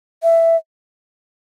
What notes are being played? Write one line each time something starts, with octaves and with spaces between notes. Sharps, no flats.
E5